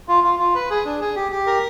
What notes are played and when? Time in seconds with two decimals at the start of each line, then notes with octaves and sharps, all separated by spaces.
0.08 F4
0.24 F4
0.39 F4
0.55 B4
0.70 G#4
0.85 D4
1.01 G#4
1.16 G4
1.32 G4
1.46 A#4